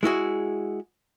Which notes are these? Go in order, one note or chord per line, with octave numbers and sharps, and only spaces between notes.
G#3 E4 F#4 G#4